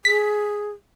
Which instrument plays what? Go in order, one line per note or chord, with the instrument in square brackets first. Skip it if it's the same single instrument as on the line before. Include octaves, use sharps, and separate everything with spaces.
[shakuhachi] G#4 [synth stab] B6